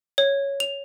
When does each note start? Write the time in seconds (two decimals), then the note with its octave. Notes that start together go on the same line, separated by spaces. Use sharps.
0.18 C#5
0.60 F7